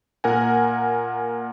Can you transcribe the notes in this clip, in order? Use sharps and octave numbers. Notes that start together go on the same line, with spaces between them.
A#2 A#4 F#5 G#5